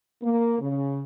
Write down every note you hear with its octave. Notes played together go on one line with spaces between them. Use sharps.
A#3
C#3